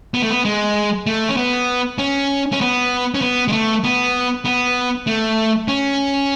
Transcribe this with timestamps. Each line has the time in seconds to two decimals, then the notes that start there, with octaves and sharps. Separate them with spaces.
0.14 B3
0.22 A3
0.30 B3
0.45 G#3
1.07 A3
1.28 C#4
1.37 B3
1.98 C#4
2.52 C#4
2.61 B3
3.15 C#4
3.22 B3
3.48 G#3
3.52 A3
3.84 B3
4.45 B3
5.07 A3
5.68 C#4